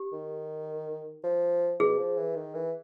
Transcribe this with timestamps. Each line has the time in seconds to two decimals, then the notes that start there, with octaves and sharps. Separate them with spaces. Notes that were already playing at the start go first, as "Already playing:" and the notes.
Already playing: G4
0.13 D#3
1.24 F3
1.80 B2 G#4
1.98 F3
2.17 E3
2.36 D#3
2.55 E3